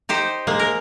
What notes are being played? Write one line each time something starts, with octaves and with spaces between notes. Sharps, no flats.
D#4 G4 C5
G#3 A#3
A#4